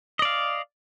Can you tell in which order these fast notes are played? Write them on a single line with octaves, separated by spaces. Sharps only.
D#5 D5 F5